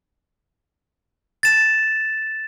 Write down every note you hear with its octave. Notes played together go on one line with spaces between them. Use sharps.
A6 E7